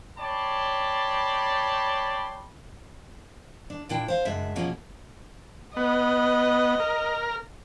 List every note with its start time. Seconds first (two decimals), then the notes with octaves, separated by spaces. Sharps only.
0.18 C#5 D5 G5 A5 B5 C6
3.70 D4
3.89 A#2 D4 E4 G5
4.08 C5 F5
4.25 F#2 C#3 G#3 D4 E5
4.56 B2 F3 A#3 C#4 G#4
5.76 B3 D#5
6.80 A#4